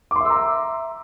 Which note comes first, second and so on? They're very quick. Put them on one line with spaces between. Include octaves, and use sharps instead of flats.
D6 C6 E5 E6 A#5